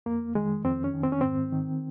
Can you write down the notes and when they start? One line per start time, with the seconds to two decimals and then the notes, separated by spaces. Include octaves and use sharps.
0.06 F2 A#3
0.35 D#3 G#3
0.64 F2 C4
0.84 C#4
0.94 D#3
1.03 C4
1.12 C#4
1.21 G#2 C4
1.52 D#3